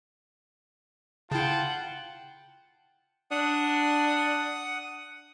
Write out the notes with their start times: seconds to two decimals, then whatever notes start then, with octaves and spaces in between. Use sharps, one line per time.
1.31 C#3 E4 F4 F#5 G5 A5
3.31 D4 F#5 D#6